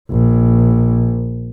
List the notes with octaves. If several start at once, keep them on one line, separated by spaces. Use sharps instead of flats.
A#1